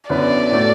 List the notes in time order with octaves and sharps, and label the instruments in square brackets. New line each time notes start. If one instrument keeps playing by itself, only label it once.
[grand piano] F#2 D3 B3 E4 B4 [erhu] D5
[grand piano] A2 A3 F#4